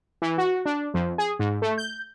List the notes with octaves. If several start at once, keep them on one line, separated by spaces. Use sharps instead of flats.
E3
F#4
D4
F2
G#4
G#2
A3
G6